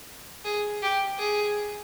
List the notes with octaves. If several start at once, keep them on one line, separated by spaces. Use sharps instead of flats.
G#4
G4
G#4